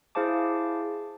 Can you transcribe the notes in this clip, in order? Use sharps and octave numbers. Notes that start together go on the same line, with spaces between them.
E4 G#4 C5 F5 A5 D6